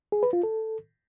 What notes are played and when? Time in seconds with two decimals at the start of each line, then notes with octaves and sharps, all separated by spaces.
0.12 G#4
0.23 B4
0.33 F4
0.43 A4